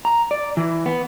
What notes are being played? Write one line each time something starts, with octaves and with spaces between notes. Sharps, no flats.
A#5
D5
E3
B3